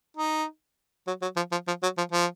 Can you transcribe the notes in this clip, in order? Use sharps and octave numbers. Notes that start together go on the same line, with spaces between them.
D#4
F#3
F#3
F3
F3
F3
F#3
F3
F3